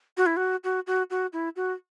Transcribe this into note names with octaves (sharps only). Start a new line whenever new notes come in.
F#4
E4
F#4
F#4
F#4
F#4
E4
F#4